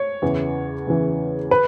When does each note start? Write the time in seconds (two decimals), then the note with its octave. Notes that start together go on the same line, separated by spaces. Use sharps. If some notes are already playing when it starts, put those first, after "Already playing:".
Already playing: C#5
0.22 E2 C#3 E3
0.87 E2 C#3 E3
1.51 B4